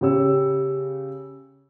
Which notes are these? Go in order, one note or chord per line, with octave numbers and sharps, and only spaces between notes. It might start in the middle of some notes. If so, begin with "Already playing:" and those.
C#3 G4 C#5 E6